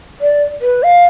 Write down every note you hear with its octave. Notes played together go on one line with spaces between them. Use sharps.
D5
B4
F5